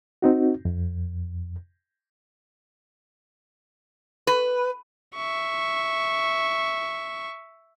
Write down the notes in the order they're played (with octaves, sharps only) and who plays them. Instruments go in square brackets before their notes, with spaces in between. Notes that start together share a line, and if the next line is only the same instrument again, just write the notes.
[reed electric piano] C4 D#4 F#4
F2
[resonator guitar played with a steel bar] B4
[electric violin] E5 C#6